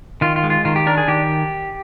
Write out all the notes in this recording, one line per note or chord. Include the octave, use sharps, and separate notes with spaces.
D#3 F4
F4
G#3
F4
D#3 F4
G4
D4 A#4
G#4
D#3 G4